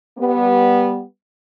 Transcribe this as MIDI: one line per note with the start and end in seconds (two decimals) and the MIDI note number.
0.18 1.01 55
0.18 1.01 59